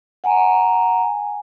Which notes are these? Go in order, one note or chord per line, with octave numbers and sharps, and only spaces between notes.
F#5 G#5 A#5